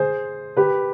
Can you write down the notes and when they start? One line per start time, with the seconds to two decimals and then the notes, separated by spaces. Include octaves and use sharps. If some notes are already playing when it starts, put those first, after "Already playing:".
Already playing: G#4 C5
0.57 G4 B4